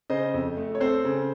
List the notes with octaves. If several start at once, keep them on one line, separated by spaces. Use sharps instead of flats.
C#3 C5 D#5
F2
A3
C#5
C4 A4 C5
C#3